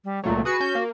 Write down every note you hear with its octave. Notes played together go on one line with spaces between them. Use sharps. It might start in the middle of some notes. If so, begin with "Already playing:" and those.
G3
C#2 A#2 F#3 A3
F#4 G#4 B4 C#7
C#4 G6
A#3